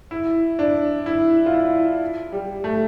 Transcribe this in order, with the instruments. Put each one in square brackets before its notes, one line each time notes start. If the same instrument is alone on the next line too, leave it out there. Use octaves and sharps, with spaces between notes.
[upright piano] E4
D4
E4
F4
E4
G3
A3